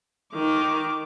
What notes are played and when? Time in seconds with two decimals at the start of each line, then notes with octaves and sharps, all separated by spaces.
0.33 D#3 D6